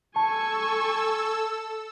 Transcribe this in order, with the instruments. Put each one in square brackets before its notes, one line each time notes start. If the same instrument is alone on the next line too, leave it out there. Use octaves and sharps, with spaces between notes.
[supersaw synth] A4 E6 [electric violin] G#5 C#6 [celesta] A5